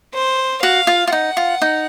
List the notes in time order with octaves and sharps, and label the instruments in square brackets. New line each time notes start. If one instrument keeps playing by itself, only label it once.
[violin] C5
[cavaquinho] F#4 [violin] F5
[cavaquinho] F4
F4
[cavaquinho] D#4 [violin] F#5
[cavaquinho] F4
D#4